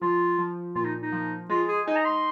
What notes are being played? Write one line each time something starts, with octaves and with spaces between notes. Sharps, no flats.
F3 F4
F3
A#2 F4
D#4
D#4
F3
G#3 F4
G#4
D#4 G#5
A#5
C6